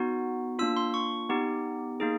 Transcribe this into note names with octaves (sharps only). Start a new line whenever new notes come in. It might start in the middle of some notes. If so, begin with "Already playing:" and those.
Already playing: B3 D#4 F#4
A#3 D4 F4 E6
C6
C#6
B3 D#4 G4
A#3 D#4 G#4